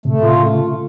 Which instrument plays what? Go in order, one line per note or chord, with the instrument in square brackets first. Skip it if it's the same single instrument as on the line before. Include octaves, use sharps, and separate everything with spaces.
[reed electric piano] A2 C3 [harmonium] A3
[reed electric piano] A2 C3 [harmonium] F4
[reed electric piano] C#3 [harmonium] A3